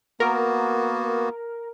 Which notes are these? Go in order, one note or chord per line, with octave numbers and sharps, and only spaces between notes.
A#3 B3 F#4 A#4